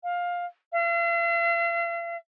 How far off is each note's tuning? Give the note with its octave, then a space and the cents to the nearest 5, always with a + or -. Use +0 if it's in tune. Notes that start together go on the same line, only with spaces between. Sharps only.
F5 +15
F5 -45